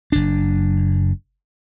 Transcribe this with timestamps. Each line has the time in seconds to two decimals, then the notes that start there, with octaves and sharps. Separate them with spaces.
0.12 F#1 D4